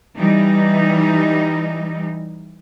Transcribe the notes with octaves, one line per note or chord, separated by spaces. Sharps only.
E3 G3 D#4